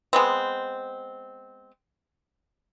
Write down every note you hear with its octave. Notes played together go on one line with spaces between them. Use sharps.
G#3 B3 C4